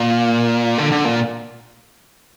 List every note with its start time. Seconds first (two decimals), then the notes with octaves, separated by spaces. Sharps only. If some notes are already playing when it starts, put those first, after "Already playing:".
Already playing: A#2
0.78 D3
0.91 D3
1.05 A#2